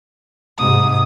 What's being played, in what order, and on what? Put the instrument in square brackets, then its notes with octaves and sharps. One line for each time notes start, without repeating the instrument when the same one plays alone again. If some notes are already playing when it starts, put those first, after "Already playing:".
[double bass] G#2 C3 [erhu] D#6